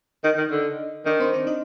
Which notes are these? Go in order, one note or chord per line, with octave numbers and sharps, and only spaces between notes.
D#3 D#4 D#5
D#3
D3
D#3 D4 D5
C4 C5
D4 D5
D#4 D#5